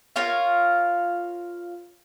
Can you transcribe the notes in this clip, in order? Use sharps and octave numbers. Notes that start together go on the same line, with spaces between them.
F4 A#4 C#5 F5